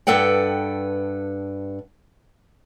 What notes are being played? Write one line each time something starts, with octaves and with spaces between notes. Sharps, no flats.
G2 A4 B4 F#5 G5